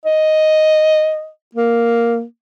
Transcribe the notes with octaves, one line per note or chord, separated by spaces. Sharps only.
D#5
A#3